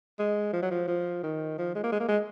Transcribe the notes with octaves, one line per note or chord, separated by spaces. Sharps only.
G#3
F3
F#3
F3
F3
D#3
F3
G#3
A#3
G#3
A#3
G#3